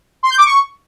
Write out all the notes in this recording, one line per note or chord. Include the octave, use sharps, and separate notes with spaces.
C6
G6
D6
C#6